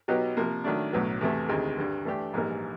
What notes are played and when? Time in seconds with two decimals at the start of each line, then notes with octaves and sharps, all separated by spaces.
0.08 B2 F#3 B3 D#4 G4
0.37 C3 F3 A#3
0.64 D#3 F#3 A3 D4
0.92 B1 A2 F#3 B3
1.21 E2 C3 E3 A3
1.49 D2 C3 D#3 G#3
1.77 G2 D3 G3
2.05 E3 A3 D4 G4
2.33 A#1 G#2 E3 G3 A#3